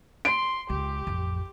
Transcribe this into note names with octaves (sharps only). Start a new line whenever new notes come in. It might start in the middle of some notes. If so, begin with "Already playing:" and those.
C6 D7
C#2 G4
A1 F2